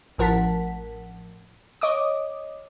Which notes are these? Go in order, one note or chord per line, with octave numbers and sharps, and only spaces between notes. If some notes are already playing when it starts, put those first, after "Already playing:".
A1 F3 A#4 F#5 A5 B6
C#5 D#5 D6 D#6